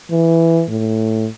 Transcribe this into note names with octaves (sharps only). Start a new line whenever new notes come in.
E3
A2